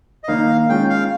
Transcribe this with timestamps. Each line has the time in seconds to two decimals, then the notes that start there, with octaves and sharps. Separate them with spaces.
0.24 D#5
0.28 D#3 A#3 D#4 F5
0.69 G#3 C#4 F4 G5
0.89 F5